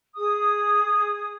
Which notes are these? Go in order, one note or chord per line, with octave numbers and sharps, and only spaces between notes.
G#4 D#6